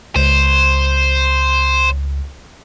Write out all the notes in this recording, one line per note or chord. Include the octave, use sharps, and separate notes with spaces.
C#2 C5